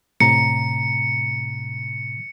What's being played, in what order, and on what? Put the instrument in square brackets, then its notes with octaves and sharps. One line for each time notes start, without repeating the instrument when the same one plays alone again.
[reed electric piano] A2 C3 A#5 [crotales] C#7